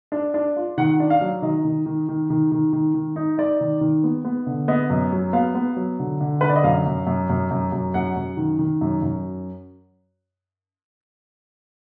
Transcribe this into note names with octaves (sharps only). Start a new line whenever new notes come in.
D4
D4
F4
D#3 F#5
D4
F5
F#3
D#3 D#5
D#3
D#3
D#3
D#3
D#3
D#3
D#3
D#4
D#4 D5
D#3
D#3
B3
B3
D3
B3 D#5
F#2
F#3
B3 F5
B3
F#3
D3
D3
D3 B4
D5
D#5
F#2 F5
F#2
F#2
F#2
F#2
F#2
F#2 F#5
F#2
D#3
D#3
F#2
F#2